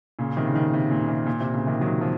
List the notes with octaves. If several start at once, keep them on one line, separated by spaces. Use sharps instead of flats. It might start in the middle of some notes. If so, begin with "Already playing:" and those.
A#2 C#3
C3 D#3
C#3
C3 D#3
C3
A#2
C#3
C3
A#2
C3
A#2 C#3
C3 D#3
D#3 F#3
F3